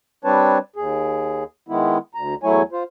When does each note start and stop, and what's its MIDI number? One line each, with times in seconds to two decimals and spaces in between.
0.25 0.58 55
0.25 0.58 60
0.25 0.58 62
0.25 0.58 71
0.25 0.58 73
0.25 0.58 81
0.76 1.44 39
0.76 1.44 68
1.69 1.98 51
1.69 1.98 56
1.69 1.98 59
1.69 1.98 64
2.15 2.35 38
2.15 2.35 82
2.43 2.62 40
2.43 2.62 54
2.43 2.62 57
2.43 2.62 64
2.43 2.62 73
2.43 2.62 80
2.72 2.83 65
2.72 2.83 72